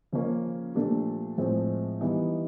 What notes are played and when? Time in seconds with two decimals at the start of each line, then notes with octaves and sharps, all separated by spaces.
0.12 C#3 F3 A#3 C#4 F4
0.75 A#2 F3 A3 D4 G4
1.38 A2 F3 G#3 C4
2.01 E3 G3 B3 D#4